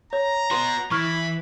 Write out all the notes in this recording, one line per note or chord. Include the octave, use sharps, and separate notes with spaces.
C#5 A#5
F#4 B4 C6
E3 B5 C#6 F6